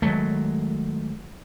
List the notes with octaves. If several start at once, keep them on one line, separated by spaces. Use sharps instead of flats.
D#3 F#3 G#3 A3